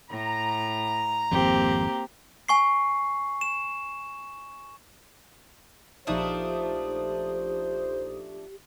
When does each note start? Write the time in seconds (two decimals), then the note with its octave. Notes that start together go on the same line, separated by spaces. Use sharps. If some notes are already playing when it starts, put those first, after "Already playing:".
0.11 A2 A#5
1.31 G#1 F2 A#3 C4 G4
2.49 G#5 C#6 C7
3.41 E7
6.07 A#1 F3 A3 D4 D#4 G4 C5 D#6